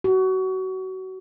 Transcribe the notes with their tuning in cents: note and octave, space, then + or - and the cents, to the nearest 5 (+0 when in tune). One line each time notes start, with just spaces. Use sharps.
F#4 +25